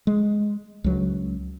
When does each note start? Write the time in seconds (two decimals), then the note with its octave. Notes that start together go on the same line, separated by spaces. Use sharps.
0.07 G#3
0.84 C#2 F#3